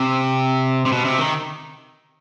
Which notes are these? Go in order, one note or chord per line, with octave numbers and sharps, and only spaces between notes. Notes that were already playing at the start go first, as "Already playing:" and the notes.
Already playing: C3
C3
B2
C3
D#3